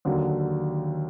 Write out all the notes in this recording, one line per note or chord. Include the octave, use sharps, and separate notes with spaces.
D#2 D3 F#3